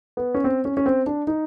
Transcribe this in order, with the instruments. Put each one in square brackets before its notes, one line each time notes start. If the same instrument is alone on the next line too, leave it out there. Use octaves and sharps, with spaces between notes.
[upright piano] B3
C#4
C4
C#4
C#4
C4
D4
D#4